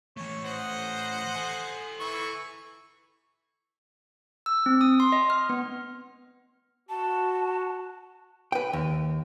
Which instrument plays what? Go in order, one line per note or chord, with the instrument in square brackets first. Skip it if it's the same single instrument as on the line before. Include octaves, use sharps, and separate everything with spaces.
[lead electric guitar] E3 A3 [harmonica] C#5
[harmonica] C5 D#5 F#5
[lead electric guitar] A4 G#5
[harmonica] E3 C#6
[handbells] E6
C4
D#6
C6
D#5
F6
B3
[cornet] F#4 [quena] A5
[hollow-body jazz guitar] B4 G5
D#2